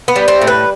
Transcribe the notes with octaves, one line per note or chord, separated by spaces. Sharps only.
B3
G3
C4
A2
B4